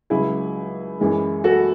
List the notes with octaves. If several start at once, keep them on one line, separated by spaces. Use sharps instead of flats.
C#2 C#3 F#3 E4 G#4
F#2 E3 G#3
F#4 A4